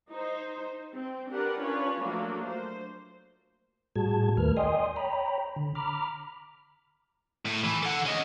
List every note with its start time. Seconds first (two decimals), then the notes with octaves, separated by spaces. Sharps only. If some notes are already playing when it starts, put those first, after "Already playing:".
0.10 D#4 C5
0.93 C4
1.30 D4 G4 A#4 B4 F#5
1.61 C#4 D4 F4 B4 C#5
2.01 F3 F#3 A3 A#3 D4 F#4
2.45 C5
3.96 A2 G3 F#4 G#4 A5 G#6
4.37 D#2 D#3 A3 A#4 B4 F6
4.57 D5 D#5 G5 G#5 C6 D#6
4.96 C#5 G5 A#5 B5
5.56 D3
5.75 A#5 B5 D6 F6
7.46 A2
7.64 E3
7.83 A4 F#5
8.05 C#4 D#5